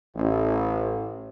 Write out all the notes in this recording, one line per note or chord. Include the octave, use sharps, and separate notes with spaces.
A1